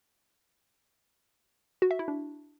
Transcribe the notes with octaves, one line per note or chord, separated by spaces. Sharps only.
F#4
E5
E4
D4